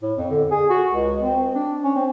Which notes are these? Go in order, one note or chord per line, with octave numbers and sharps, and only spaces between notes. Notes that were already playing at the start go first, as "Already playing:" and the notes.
A2
F2
D3
G#4
F#4
C#2
C4
D4
C#4
C4